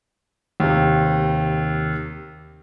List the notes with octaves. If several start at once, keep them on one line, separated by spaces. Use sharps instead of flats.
D#2 C3